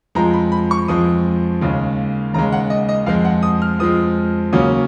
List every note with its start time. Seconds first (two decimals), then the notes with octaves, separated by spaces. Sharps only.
0.15 F2 F3 G#3 A#5
0.33 B5
0.52 B5
0.71 C#6
0.88 F2 F3 G#3 D#6
1.61 D#2 C#3 G#3
2.34 D#2 C#3 G#3 A#5
2.52 F#5
2.70 D#5
2.89 D#5
3.06 F2 F3 G#3 F5
3.25 F#5
3.43 D#6
3.62 F6
3.79 F2 F3 G#3 D#6
4.52 D#2 C#3 F#3 A#3 C#4 D#6